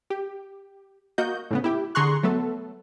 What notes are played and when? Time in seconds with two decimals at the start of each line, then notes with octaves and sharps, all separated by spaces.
0.10 G4
1.18 A#3 F#4 D#5 G6
1.51 A2 C#3 B3
1.64 E4 G4
1.95 D3 G#4 A#5 C6 C#6 F#6
2.23 F#3 A3 B3 A4